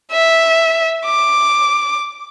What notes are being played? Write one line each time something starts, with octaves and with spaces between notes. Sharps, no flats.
E5
D6